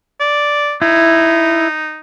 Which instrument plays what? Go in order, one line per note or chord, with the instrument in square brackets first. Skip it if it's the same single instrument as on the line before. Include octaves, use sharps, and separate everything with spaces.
[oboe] D5
[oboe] D#4 [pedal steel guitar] E4